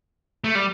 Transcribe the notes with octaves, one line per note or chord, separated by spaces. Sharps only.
A3
G3